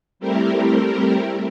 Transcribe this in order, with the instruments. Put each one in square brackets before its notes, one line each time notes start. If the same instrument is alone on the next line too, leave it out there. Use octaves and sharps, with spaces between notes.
[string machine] G3 A3 C4 E4 G4 A#4